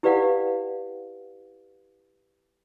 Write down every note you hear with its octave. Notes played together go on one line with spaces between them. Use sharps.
E4 G4 B4 D5 F5 F#5